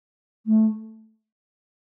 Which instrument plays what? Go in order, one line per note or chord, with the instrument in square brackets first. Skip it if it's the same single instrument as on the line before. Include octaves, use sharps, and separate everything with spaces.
[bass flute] A3